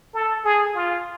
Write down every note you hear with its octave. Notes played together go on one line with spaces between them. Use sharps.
A4
G#4
F4